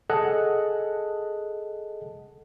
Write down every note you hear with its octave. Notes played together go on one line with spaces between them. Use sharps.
G#4 A4 D#5 F#5 A5 F#6